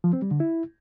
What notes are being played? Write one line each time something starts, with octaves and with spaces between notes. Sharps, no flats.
F3
C4
G3
D3
E4